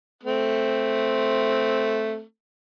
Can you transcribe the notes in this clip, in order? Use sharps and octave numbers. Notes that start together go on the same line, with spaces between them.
A3 C4